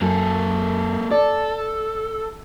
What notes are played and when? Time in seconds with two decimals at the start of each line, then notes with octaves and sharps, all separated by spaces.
0.01 F#2 A#3 A4
1.11 A4 D5